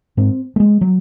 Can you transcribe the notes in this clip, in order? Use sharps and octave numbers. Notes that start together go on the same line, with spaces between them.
G#2 C4
A3
G#3
F#3